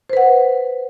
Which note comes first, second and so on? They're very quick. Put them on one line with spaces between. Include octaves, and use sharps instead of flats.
C5 B4 F#5